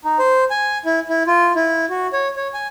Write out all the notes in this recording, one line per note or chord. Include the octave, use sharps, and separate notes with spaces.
D#4
C5
G#5
E4
E4
F4
E4
F#4
C#5
C#5
G#5